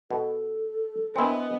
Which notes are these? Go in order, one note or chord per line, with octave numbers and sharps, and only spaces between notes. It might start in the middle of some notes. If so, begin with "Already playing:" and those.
B2 A4
B3 C4 D4 E4 A#4 D#5 G#5